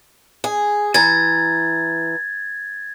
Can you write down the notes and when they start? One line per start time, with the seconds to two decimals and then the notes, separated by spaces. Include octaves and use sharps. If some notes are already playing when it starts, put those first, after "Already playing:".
0.44 G#4
0.94 E3 A#5 G#6 A6